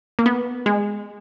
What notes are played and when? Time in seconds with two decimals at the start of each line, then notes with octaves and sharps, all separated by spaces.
0.19 A#3
0.26 B3
0.66 G#3